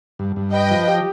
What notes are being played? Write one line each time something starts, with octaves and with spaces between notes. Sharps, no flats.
G2
G2
B4 D#5 G5
F3
G4